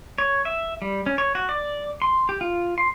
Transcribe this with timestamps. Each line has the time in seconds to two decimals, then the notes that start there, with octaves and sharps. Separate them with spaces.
0.18 C#5
0.45 E5
0.82 G3
1.06 C#4
1.18 C#5
1.35 F#4
1.49 D5
2.02 C6
2.29 G4
2.41 F4
2.78 C6